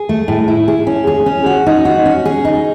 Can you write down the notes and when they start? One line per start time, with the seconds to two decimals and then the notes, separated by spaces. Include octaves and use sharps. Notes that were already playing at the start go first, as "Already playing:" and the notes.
Already playing: G#4
0.09 A3
0.28 A2
0.48 E4
0.68 G#4
0.87 C#4
1.07 G#4
1.26 C#4
1.46 F#4
1.66 D#4
1.85 F#4
2.05 C#4
2.25 G#4
2.45 D#4